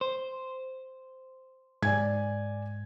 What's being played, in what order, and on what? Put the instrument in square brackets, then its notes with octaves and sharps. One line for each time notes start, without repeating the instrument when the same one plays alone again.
[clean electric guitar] C5
[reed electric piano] G#2 [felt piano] D5 G#5 G#6